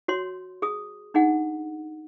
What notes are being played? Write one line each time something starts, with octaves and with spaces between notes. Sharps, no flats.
F#4 C#5 C6
G#4 D#6
D4 D#4 G#4 F#5